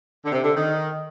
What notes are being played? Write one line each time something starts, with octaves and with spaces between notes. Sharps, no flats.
D3
C3
D3
D#3